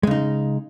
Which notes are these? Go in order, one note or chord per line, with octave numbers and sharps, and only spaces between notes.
C#3 G#3 D#4